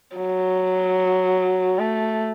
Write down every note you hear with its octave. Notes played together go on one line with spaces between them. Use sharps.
F#3
A3